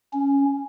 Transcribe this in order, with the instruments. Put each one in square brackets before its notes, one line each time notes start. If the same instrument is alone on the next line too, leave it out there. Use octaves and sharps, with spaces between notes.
[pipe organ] C#4